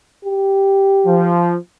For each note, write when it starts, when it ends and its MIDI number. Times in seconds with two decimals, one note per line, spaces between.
0.24 1.34 67
1.06 1.56 53